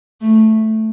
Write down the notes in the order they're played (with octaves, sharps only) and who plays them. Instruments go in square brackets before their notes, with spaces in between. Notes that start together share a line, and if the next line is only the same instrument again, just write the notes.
[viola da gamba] A3